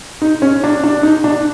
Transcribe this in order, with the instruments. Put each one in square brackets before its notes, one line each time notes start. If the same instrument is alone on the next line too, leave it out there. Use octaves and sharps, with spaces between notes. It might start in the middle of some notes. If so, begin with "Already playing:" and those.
[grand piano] D#4
C#4
D4
D4
D#4
D4